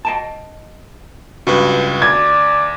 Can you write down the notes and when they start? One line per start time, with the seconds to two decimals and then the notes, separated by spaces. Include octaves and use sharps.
0.05 D#5 G5 A5
1.47 C#2 G2 F#4 B4
2.02 D2 D5 G#6